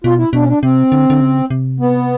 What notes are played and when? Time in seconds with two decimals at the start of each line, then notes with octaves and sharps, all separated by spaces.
0.04 B2 F4
0.19 E4
0.33 B2 D4
0.42 C#4
0.48 D4
0.63 C3 C4
0.92 D3
1.10 D3
1.21 C#3
1.50 C3
1.80 B3